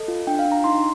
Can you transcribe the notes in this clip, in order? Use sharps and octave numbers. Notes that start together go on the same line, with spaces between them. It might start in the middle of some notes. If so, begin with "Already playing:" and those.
Already playing: A4 D#5
F4
D4 G5
F5
D4
A#5
D#4 C6